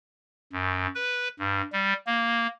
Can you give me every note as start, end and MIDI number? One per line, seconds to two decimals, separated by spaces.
0.53 0.87 42
0.95 1.28 71
1.39 1.62 43
1.73 1.93 55
2.07 2.47 58